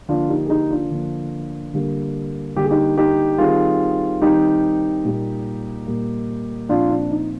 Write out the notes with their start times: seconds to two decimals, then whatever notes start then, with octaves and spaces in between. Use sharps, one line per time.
0.08 D3 F3 A#3 D4 F4
0.29 D#4 G4
0.46 G#4
0.50 D#4 G4
0.70 D4 F4
0.91 D3 F3 A#3
1.74 D3 G3 A#3
2.56 D3 G3 A#3 G4
2.63 G#4
2.71 D#4 G4
2.97 D#4 G4
3.38 D#3 G3 C4 F4 G#4
4.22 D#3 G3 C4 D#4 G4
5.05 A#2 G3 A#3
5.87 A#2 G3 A#3
6.69 A#2 F3 C4 D4 F4
6.90 D4
7.10 D#4